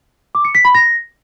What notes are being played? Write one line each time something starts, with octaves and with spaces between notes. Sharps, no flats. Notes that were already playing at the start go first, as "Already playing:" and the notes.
D6
C#7
B6
B5
A#6